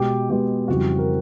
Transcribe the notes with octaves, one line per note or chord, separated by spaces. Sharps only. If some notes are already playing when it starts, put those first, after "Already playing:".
Already playing: B2 G#3 B3 G4
B2 G#3 B3 G4
F2 C#3 E3 G3 C4 F#4
A#4